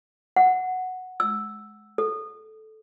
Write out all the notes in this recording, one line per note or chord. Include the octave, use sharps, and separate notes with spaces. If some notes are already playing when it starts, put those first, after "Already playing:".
F#5
E6
A4